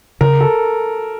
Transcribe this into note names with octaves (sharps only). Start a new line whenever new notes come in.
C#3 A#4
A4